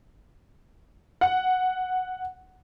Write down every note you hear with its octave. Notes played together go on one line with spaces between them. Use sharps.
F#5